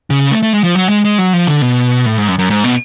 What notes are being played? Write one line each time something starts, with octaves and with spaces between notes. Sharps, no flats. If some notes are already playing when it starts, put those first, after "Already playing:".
C#3
A3
A3
G#3
F3
F#3
G#3
G#3
F#3
F3
D3
B2
A2
G#2
F#2
F#2
G#2
B2